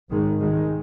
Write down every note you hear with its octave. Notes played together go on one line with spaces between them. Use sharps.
G#1 G#2 D#3 G#3
C2 C3 D#3 G#3